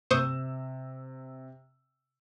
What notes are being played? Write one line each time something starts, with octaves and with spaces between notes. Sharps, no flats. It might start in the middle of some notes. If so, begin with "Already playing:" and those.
C3 C5 C#6 D#6 E6 E7